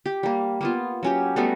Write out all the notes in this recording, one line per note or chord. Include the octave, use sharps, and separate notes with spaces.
G4
G3 A#3
A#3 B3 F4
F#3 C#4 G4
G3 A3 B3 F#4